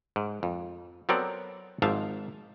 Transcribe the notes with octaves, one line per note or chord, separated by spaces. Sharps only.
G#2
F2
F#3 B3 C4 A4 A#4 D5
G#1 G#2 F3 E5 F5 A5